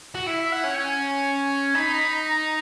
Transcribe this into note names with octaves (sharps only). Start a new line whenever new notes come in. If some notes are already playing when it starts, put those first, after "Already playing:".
F#4
E4 E5
E5
F#5
C#4
G#5
D#4 B5
B5
A#5
A#5